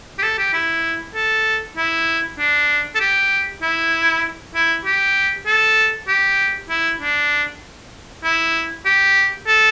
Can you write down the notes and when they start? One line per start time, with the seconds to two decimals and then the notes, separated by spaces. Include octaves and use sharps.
0.18 G4
0.23 A4
0.38 G4
0.53 E4
1.15 A4
1.77 E4
2.39 D4
2.95 A4
3.00 G4
3.62 E4
4.55 E4
4.85 G4
5.47 A4
6.08 G4
6.70 E4
7.00 D4
8.24 E4
8.86 G4
9.47 A4